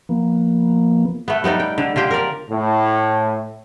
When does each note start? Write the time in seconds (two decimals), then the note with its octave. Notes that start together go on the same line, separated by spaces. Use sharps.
0.09 F3 A#3 B3
1.28 A3 B3
1.44 G3 B3 D#4 D5
1.60 G5
1.78 D3
1.96 D3 F4 G4 G5
2.11 A#4 D5
2.50 A2